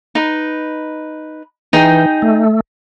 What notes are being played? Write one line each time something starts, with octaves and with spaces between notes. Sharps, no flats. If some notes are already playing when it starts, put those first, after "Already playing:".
D#4 B4
E3 D#4 G#4 G5
A3